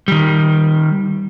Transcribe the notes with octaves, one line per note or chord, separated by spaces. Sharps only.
D#3 G3